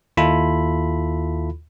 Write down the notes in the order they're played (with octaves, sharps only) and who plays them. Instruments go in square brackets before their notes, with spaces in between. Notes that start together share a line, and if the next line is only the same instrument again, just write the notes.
[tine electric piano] D#2 E4 F4 A4 B5